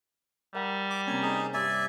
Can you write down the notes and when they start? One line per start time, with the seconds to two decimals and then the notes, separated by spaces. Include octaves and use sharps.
0.54 G3 A#4 E5 F#5
0.90 D6
1.07 C3 A#3 C#4 G#5
1.22 D#4 G#4
1.54 G2 D5 E5 G#5 C6